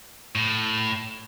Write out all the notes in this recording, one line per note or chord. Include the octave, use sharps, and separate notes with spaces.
A2